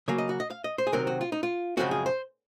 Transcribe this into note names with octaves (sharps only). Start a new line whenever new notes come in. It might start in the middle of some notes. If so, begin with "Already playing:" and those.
C#3 F#3 A#3 C#5
D#5
F#4
D#5
F5
D#5
C5
G#4
C3 D#3 F#3 C4 A#4
F#4
F4
D#4
F4
F#2 C#3 F3 G#3 C4 F#4
G#4
C5